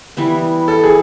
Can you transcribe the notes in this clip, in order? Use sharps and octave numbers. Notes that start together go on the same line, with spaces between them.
E3 G3 B3 E4
A4
G#4